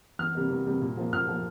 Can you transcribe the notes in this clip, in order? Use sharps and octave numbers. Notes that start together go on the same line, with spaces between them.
E2 F6
C3 G3 A#3
E2
C3 G3 A#3
A#2
F3 A#3
A#2 F6
F3 A#3